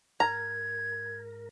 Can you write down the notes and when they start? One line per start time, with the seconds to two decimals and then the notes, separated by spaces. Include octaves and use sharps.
0.20 G#2 A#4 A#5 G#6